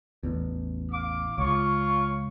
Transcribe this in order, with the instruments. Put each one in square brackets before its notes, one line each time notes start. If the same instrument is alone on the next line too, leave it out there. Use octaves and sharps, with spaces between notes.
[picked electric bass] A1 E2
[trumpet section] F5 D6
[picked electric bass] C#2 [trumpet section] F4 C#5 C#6